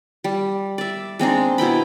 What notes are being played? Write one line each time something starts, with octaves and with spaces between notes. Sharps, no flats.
G3
D5 E5
G#3 C4 D4 D#4
B2 E4 G5 B5